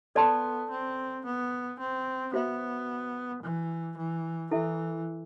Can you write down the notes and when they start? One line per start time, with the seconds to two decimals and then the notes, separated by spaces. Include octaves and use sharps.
0.16 B3 A4 D5 A5 C6
0.71 C4
1.25 B3
1.79 C4
2.34 B3 F#4 C5 E5
3.43 E3
3.97 E3
4.51 E3 E4 A4 E5